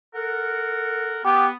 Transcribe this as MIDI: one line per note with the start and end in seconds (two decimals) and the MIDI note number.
0.15 1.19 69
0.15 1.19 70
0.15 1.19 78
1.25 1.53 59
1.25 1.47 67